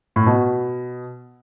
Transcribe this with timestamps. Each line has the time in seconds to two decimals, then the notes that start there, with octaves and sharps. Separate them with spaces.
0.16 A2
0.26 B2